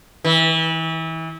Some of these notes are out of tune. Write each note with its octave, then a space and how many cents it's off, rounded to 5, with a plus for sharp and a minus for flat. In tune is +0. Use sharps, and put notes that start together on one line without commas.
E3 -30